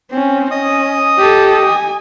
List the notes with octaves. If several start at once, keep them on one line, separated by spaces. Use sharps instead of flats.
C4 C#4
C#4 D#5 D#6
G4 A4
G#5